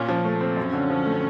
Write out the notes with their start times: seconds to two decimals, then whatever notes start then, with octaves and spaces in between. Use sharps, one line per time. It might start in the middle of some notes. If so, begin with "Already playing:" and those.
Already playing: A#2 C#4
0.09 F3
0.25 A3
0.41 C4
0.57 F#2 C#4
0.73 D3
0.90 F3
1.05 A3